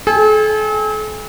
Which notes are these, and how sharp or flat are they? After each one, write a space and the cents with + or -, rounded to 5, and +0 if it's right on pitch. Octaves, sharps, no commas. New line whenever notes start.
A4 -45 G#5 -35